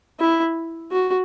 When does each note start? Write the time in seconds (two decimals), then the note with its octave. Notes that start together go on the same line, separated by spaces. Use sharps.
0.20 E4
0.91 F#4